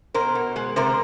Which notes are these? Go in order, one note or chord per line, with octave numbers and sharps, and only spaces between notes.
B2 A#4 C5
B2
G#3
C3 A#4 C5